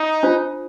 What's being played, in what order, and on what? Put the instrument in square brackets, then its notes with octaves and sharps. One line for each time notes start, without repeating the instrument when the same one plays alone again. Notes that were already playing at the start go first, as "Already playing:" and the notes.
Already playing: [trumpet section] D#4
[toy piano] D4 F4 C5